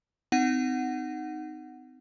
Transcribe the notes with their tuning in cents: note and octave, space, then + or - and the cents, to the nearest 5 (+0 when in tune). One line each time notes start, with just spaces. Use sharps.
C4 -35 D#4 -10 F#5 +0